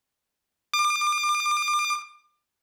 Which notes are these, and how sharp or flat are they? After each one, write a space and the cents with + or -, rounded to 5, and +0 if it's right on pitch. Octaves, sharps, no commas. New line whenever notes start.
D6 +35